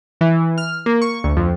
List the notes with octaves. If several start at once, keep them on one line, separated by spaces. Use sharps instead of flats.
E3
F6
A#3
C#6
D2
F2